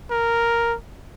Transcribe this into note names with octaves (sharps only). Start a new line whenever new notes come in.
A#4